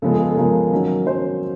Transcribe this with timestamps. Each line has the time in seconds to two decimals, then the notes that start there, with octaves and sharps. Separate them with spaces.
0.02 C#3 F3 G#3 B3 A4
0.12 G#4
0.22 A4
0.37 C#3 F3 G#3 B3 A#4
0.72 D#3 F#3 A#3 C#4
1.06 F#3 A#3 C#4 C5